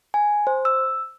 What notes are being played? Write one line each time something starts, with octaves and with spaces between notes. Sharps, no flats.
G#5
C5
E6